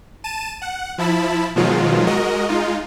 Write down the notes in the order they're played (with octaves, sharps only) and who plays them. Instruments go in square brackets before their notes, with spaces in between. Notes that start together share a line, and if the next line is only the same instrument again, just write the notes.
[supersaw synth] A5 D#7 E7
F#5
F3 E4 A5 B5
B2 D#3 F3 F#3 G#3 F4
G#3 F#4 A#4 D#5
G#3 D#4 F4